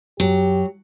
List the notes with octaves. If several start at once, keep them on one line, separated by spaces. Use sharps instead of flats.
F#2 F#3 G4